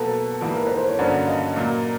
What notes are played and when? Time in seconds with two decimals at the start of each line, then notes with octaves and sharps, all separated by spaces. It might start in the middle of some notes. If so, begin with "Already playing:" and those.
Already playing: B2 F#3 A#3 A4 B4
0.41 G#2 E3 G3 A#3
0.56 A#4
0.67 B4
0.77 C5
0.88 C#5
0.98 G2 D3 F#3 A#3 C#4 C5 D5
1.27 D#5 F5
1.56 A#2 F#3 A#3